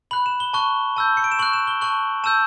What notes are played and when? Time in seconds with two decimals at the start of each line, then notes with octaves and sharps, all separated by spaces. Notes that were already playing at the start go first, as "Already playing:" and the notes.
0.11 B5 F#6 F#7
0.26 E7
0.40 G7
0.53 A5 C#6 F#6 G7
0.96 A5 E6 G6
1.17 C#7
1.24 D7
1.32 E7
1.39 C#6 F#6 F#7
1.53 E7
1.67 G7
1.81 A5 C#6 F#6 F#7
2.24 A5 E6 G6 E7